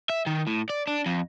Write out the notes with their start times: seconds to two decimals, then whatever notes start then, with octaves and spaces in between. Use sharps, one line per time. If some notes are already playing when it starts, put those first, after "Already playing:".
0.10 E5
0.26 D#3
0.47 A2
0.70 D5
0.87 D4
1.06 F2